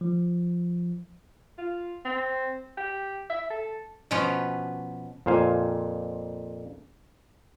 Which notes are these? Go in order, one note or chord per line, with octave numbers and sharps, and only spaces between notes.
F3
F4
C4
G4
E5
A4
B2 F3 B3 C#4
F2 A#2 C5 F5 G#5